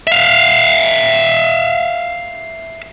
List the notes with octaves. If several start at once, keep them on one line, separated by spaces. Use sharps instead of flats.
E5 F5